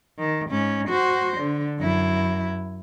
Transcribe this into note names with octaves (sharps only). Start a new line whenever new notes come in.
D#3
G#2 C#4
F#4 C5
D3
F#2 E4